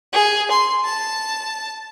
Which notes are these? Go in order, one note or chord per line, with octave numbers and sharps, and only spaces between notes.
G#4
C6
A5